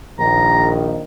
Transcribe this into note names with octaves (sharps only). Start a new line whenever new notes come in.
A#1 D#3 A#5